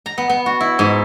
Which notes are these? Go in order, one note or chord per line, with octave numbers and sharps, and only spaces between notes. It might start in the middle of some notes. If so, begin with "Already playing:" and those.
A#5
B3
B3
F#4
E4
G#2